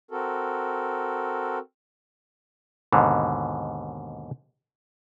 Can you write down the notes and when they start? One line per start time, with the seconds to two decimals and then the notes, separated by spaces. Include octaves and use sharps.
0.11 C4 F#4 A4 A#4
2.92 D#2 G#2 B2 D3